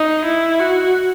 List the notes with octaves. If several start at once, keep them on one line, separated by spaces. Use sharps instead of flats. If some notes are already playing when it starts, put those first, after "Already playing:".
Already playing: D#4
E4
F#4